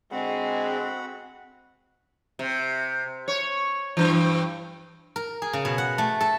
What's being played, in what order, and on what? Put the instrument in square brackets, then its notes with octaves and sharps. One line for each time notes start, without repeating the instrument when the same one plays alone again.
[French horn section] D3 G#3 [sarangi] C4 [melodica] F#4 F#5 B5
[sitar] C3
C#5
G2 E3
[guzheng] A#4
G#4
C#3
B2
F#5
A3
A4